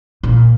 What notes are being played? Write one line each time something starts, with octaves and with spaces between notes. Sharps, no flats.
A#2